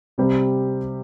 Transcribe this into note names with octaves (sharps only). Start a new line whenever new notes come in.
C3 G3 C4 G4